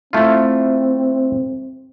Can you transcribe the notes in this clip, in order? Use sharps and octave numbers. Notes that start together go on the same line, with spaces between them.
A3 C4 E4 F4